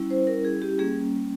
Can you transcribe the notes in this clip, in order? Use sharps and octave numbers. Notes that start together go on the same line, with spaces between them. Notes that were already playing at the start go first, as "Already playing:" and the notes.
Already playing: G3 C#4 E4
C5
A#4
G#4
G4
G3 A#3 C#4 G#4